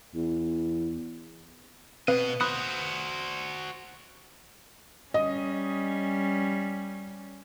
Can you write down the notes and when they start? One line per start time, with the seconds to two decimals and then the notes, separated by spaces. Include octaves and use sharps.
0.15 E2
2.08 B2 C4 B4 D#5 F5
2.41 F#4 C5 B5 D#6 F#6
5.14 G3 C#4 D#5